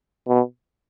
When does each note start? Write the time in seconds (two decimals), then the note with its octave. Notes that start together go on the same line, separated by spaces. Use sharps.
0.28 B2